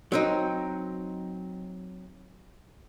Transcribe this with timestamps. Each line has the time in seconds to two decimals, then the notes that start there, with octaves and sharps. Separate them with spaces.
0.12 F#3 C4 D#4